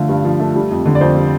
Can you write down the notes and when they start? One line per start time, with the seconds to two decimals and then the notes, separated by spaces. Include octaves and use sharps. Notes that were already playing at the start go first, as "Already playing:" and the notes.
Already playing: D3 F3 A3 F5
0.09 G2
0.24 F3
0.40 A3
0.55 G3
0.71 F2
0.86 D3
0.95 D5
1.01 F2 C5
1.16 G3